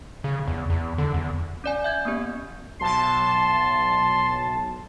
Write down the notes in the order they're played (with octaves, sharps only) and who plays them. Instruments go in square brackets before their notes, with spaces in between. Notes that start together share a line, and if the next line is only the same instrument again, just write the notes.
[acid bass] C#3
E2
E2
D3
E2
[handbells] C#4 D5 G#5
E5 G6 G#6
A#3 B3 C#4 G4
[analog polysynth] B1 A5 [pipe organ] C6